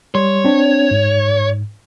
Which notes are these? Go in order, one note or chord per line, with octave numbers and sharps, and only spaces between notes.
G3 C#5 C6
C4 D4
G#2